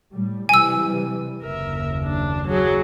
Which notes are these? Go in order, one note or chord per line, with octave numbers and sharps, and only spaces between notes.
A2 G3
C3 E3 G3 G#5 E6
F#1 D#2 A#4 E5
D4
F#3 G#4